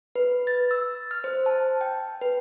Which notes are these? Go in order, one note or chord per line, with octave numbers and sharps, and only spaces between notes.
B4
A6
E6
F6
C5
A5
G5
B4